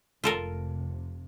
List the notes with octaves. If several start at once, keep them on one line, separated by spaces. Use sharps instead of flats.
F1 C3 F4 A4 A#4